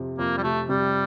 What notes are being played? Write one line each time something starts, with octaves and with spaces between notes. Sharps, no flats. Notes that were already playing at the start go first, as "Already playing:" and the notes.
Already playing: F2 C3
F2 A#3
G3
C3 A3
C3 G3